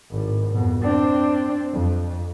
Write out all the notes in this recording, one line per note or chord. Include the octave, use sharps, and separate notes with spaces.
G#1 A2
F2 B2
C4 D4
F2